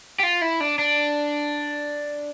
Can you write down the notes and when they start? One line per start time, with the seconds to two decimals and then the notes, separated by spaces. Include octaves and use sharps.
0.20 G4
0.23 F4
0.42 E4
0.60 D4
0.79 D4